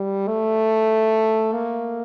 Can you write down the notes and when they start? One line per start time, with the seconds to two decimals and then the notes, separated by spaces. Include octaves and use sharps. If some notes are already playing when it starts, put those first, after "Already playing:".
Already playing: G3
0.27 A3
1.52 A#3